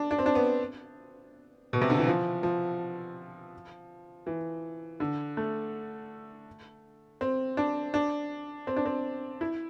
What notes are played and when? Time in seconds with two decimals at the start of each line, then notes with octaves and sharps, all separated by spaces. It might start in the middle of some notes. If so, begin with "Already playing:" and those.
Already playing: D4
0.11 D4
0.19 C4
0.26 D4
0.35 B3
1.73 B2
1.82 C3
1.90 D3
1.98 E3
2.07 F3
2.43 F3
4.27 E3
5.00 D3
5.37 A3
7.21 C4
7.57 D4
7.94 D4
8.67 C4
8.76 D4
8.85 C4
9.41 E4